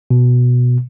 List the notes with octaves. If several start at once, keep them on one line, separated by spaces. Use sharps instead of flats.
B2